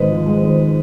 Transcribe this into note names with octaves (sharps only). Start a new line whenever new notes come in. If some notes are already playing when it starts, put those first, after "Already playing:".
Already playing: G#1 G#2 B4 D#5
F3
G#3
G#1